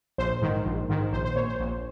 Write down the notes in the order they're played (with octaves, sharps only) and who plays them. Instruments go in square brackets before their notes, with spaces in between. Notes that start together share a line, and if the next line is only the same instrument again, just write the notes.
[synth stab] A#1 C5
G#2 D#3
A#1
G#2 D#3
A#1 C5
C5
A#2 C#5
C5
A#1